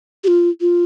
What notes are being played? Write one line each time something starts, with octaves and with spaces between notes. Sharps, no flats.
G4
F4
F4